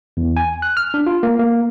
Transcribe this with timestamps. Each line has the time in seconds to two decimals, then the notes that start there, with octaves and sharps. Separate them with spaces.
0.17 E2
0.37 G#5
0.62 F#6
0.77 F6
0.94 D4
1.06 F4
1.23 A#3
1.39 A#3